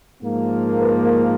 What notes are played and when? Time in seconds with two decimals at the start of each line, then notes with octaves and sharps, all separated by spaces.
0.22 G#2 F3 A#3
0.80 B4